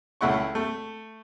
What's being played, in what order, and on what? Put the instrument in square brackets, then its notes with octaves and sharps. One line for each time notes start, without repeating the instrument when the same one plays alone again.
[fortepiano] C#2 A3 E4 F#5 C#6
A3